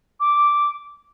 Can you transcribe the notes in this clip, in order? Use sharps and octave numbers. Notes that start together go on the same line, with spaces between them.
D6